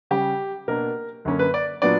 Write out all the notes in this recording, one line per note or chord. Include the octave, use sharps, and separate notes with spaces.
C#3 G3 C#4 G4
B2 A#3 D4 A#4
F#2 D3 A#3 C#4
B4
D5
A#2 F#3 B3 D4 D5